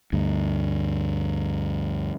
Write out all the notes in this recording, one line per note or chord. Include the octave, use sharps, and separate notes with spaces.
D2 G2